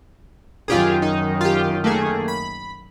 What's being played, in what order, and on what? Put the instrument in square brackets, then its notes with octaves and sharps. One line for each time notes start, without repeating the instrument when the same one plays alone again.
[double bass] F#2 D#3 [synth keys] F4 G4 G#4
[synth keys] D#4
F4 G4
A3 A#3 G#4
B5